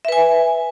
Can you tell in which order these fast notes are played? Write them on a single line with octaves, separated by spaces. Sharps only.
E5 B4 G#5